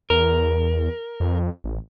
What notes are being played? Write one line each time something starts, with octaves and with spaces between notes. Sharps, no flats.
E2 A#4
F2
A1